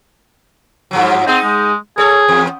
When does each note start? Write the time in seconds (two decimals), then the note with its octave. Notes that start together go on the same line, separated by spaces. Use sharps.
0.91 G2 F3 F#3
1.27 C4 D#4 G#4
1.44 G#3
1.98 G#4 A4 C#5
2.28 E2